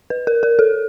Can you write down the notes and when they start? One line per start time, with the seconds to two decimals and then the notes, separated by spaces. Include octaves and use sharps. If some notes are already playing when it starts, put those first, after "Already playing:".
0.10 B4
0.27 A#4
0.43 A#4
0.59 A4